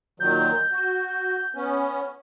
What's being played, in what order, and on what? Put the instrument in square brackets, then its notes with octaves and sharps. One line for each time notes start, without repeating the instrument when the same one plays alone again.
[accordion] A#2 D#3 F#3 [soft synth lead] G6
[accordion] F#4
B3 C#4